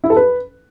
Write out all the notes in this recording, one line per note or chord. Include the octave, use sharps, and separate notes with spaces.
E4
A4
B4